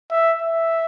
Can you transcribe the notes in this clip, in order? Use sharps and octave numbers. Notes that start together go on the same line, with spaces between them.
E5
E5